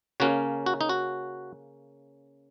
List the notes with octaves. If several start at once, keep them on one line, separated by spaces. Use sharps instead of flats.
C#3 A#3 C#4 F#4
F#4
D#4
F#4